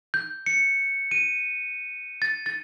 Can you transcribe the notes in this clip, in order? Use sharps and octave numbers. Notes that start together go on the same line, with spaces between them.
G6
C#7
D#7
A6
A6